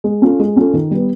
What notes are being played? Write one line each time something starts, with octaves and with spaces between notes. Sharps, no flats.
G#3
C#4 F4 A4
G#3
C#4 F4 A4
D#3
G3 B3